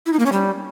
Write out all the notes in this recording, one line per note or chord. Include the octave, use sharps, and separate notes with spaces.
E4
D#4
A#3
C#4
G3